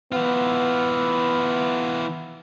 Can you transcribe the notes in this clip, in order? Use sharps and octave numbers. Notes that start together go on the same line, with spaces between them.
E3 B3 F4